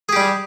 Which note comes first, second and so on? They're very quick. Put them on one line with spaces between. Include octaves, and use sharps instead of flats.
G#4 G4 G3